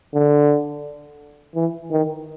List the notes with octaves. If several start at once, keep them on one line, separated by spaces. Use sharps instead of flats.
D3
E3
D#3